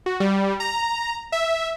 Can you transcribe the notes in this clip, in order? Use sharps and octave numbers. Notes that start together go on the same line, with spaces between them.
F#4
G3
A#5
E5